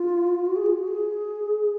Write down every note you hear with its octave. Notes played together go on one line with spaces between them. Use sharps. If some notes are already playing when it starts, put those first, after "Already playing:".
Already playing: F4
F#4
G#4
F4
F#4
G#4